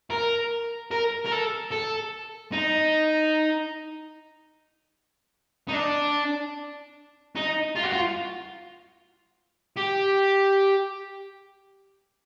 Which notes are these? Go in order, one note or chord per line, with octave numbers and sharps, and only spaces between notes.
A#4
A#4
A#4
A4
A4
D#4
D#4
D4
D#4
F4
F#4
F4
G4